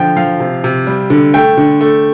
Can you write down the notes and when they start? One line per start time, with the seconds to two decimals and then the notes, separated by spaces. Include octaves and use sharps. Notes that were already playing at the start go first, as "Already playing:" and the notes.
Already playing: D3 F3 G5
0.16 F3 F5
0.40 C3
0.64 C3
0.87 G3
1.10 D3
1.34 A3 G5
1.57 D3
1.81 A3